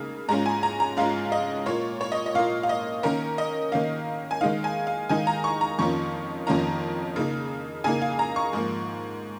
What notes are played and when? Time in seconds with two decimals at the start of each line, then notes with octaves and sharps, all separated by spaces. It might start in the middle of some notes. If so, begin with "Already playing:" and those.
Already playing: C#3 A#3 D#4
0.29 G#2 G#3 C#4 F4 A#5
0.46 G#5
0.63 A#5
0.80 A#5
0.97 G#2 G#3 C#4 F4 F5
1.32 D#5
1.66 A#2 A#3 F4 C#5
2.01 C#5
2.12 D#5
2.26 D#5
2.35 A#2 A#3 F4 F5
2.63 F5
2.69 D#5
3.03 D#3 A#3 C#4 A#4
3.38 D#5
3.72 D#3 A#3 C#4 F5
4.31 G#5
4.41 D#3 G#3 D#4 F5
4.64 G#5
4.87 F5
5.09 D#3 G#3 D#4 G#5
5.27 A#5
5.44 C#6
5.61 A#5
5.79 F2 D#3 A#3 C#4 F4 C#6
6.47 F2 D#3 A#3 C#4 F4 A#5
7.16 C#3 A#3 D#4
7.84 C#3 A#3 D#4 G#5
8.02 F5
8.19 A#5
8.36 C#6
8.53 G#2 F3 A#3